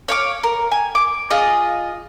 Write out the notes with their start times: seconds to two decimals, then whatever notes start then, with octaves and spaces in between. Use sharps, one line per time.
0.08 C#5 F5 D6
0.43 A#4
0.72 G#5
0.95 D6
1.30 F4 G#4 D#5